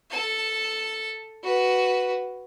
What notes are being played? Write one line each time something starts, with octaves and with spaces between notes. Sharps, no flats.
A4 A5
F#4 B4